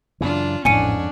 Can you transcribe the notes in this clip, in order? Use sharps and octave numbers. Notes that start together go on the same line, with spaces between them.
F#2 C#3 E3 D4 F4
A1 F2 G#2 C#4 D4 G#5 C#7 D#7